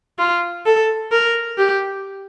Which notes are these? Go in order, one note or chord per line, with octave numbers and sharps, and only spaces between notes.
F4
A4
A#4
G4